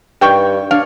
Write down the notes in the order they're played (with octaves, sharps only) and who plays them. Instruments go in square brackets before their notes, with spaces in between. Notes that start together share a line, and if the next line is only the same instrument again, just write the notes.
[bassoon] G2 [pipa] D#3 G5 C#6
[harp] D4 C#5 [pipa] F5